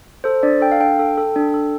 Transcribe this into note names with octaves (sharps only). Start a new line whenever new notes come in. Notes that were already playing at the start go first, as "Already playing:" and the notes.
A4 C5
D4 D5
A4 G5
F5
D4 G5
A4
A4
D4
A4